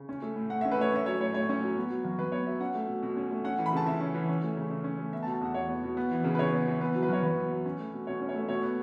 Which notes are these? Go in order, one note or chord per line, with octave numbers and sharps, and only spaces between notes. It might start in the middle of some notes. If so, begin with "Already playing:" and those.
Already playing: C#3
C#4
A3
A2
A2 F#5
C#4 E5
B4
A3 C#5
C#4 E5
F#3 C#5
A2 C#5
A2 C#5
C#4
F#3
B3
F#3
F#2
F#2 B4
B3 C#5
F#3 E5
C#4 F#5
A3
B2
B2
C#4
A3
C#4 F#5
E3
B5
C#3 A5
C#3 E5
C#4
E3
C#4
A3
C#3
C#3
C#4
A3
B3 E5
A5
B2
A5
E2 F#5
E2 C#5
B3
B2
B3
E3
C#3
B4
C#3 C#5
B3
E3
B3 B4
F#3
B4
F#2 C#5
F#2 B4
B3
F#3
C#4
A3
B2
B2 C#5
C#4
C#5
A3
B2 C#5
B3